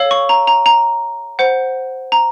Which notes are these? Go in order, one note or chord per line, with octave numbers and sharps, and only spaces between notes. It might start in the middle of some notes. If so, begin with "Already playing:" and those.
Already playing: A4 C#5 F5
C#6
A#5
A#5
A#5
C5 F#5
A#5